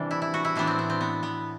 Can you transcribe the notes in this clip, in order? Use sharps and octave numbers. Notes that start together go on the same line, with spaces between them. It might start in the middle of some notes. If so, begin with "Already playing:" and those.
Already playing: C3 E3 G3 D4
E4
E4
F#4
E4
A2 E3 B3 D4
C4
D4
C4
B3
B3